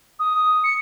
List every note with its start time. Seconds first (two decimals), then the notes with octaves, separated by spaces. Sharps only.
0.19 D#6
0.64 C#7